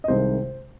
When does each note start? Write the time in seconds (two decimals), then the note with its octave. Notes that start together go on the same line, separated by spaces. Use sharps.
0.04 D#5
0.08 C2 C3 D#3 G#3 C5